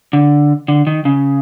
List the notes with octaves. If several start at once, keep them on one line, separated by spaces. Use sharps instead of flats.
D3
D3
D#3
C#3